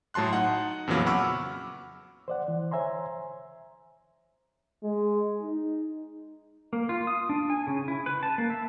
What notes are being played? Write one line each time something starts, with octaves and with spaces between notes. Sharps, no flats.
A2 F#3 A5 C6 F#6
D#4 F#5
F2 A#2 C#3 E3 F#3 B3
F#5 B5 C#6 D6 E6 F6
C5 D5 F#5
E3
C5 C#5 E5 G#5 A#5 C6
G#3
D#4
A#3
F4
D#6
D4
G#5
C#3
E4
B4
A5
A#3
E5